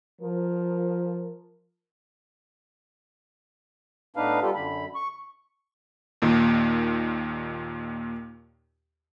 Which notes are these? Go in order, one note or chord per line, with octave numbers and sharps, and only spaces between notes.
F3 A#4
A2 B3 D4 D#4 B4 F5
G3 B3 F4 G4 A4
F#2 D3 B5
C#6
D#2 A#2 D#3